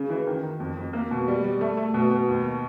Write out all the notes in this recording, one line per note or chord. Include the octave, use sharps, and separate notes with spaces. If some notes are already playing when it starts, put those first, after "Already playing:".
Already playing: C#3
E3
D#3
D#3
F2
F2
A#3
B2
G3
G3
A3
A3
B2
B2
D#2